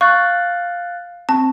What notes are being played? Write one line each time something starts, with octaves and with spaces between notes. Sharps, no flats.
F5 C#6 F#6 A6
C4 A5